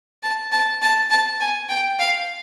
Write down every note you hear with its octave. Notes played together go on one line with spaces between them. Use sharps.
A5
A5
A5
A5
G#5
G5
F5